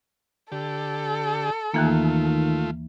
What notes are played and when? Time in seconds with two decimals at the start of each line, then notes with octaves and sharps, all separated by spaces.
0.52 D3 G4 A4
1.74 D#2 D#3 E3 A3 A#3 F4